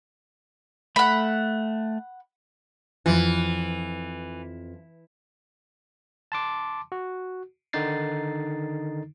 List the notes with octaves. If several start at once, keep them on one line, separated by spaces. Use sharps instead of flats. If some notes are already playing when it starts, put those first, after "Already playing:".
A3 F#5 B5
F2 E3 F4
A5 C6 D6
F#4
D3 D#3 D#4 A6 C7